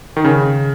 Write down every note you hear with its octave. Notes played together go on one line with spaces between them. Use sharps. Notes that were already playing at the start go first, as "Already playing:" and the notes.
D#3
C#3